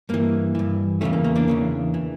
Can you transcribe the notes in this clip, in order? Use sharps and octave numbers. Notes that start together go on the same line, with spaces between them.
G2 E3 A#3
G2 E3
E2 C#3 E3 A3 C#4
A#3
A#3
A#3 D4
E2 C#3 E3
E3